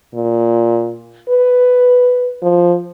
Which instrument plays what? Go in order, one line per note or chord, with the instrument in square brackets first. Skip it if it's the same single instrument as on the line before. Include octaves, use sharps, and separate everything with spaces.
[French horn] A#2
B4
F3